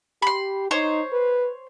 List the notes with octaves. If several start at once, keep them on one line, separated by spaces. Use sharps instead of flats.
G4 B5 C6
D#4 C5 C#5
B4